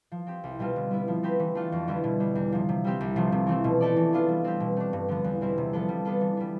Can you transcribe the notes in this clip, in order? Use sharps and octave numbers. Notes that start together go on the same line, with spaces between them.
F3
C4 G4
C2
B2 G3 C4 F4
D3
G3 B3 E4
F3
A3 C4 G4 B4
E3
A3 D4 F4 A4
F2
D3 G3 B3 E4
B2
G3 D4
E2
C3 F3
C3
G3 C4 G4
C2
C3 F3 A3
C3
E3 A3 C4
B2
A3 E4 A4 D5
E3
B3 D4 F4
G3
C4 G4
B2
A3 D4
G2
D3 F3 B3
E2
B2 G3 C4 E4
C3
F3 B3 D4 A4
G3
B3 D4 F4 A4
E3
G3 B3